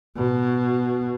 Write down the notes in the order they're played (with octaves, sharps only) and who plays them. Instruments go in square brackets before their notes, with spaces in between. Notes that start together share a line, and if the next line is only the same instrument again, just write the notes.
[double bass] B2